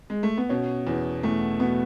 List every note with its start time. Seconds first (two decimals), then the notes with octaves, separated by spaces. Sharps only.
0.10 G#3
0.23 A3
0.37 B3
0.49 B2 C#4
0.87 E2
1.23 E2 A3
1.60 B2 B3